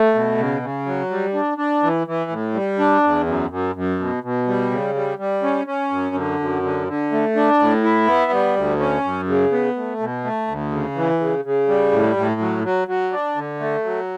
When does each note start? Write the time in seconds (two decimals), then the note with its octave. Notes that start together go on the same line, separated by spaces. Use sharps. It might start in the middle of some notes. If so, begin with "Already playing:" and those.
Already playing: A3
0.14 B2
0.38 C#3
0.62 C#3
0.86 F#3
1.11 G3
1.34 D4
1.58 D4
1.83 E3
2.07 E3
2.31 A2
2.54 G3
2.79 D4
3.03 E2
3.26 F#2
3.50 F#2
3.75 F#2
3.99 B2
4.23 B2
4.47 G3
4.71 C#3
4.95 G3
5.19 G3
5.43 C#4
5.67 C#4
5.91 F#2
6.16 D3
6.40 F#2
6.63 D3
6.88 D3
7.12 A3
7.36 D4
7.59 A2
7.84 E4
8.07 B3
8.32 G3
8.56 D2
8.80 C#4
9.04 F#2
9.28 C#3
9.52 B3
9.76 A3
10.00 B2
10.24 A3
10.47 D2
10.71 C#3
10.96 E3
11.20 C#3
11.45 C#3
11.68 G3
11.92 A2
12.16 A2
12.40 F#3
12.64 F#3
12.88 F#3
13.12 D4
13.36 D3
13.60 A3
13.85 F#3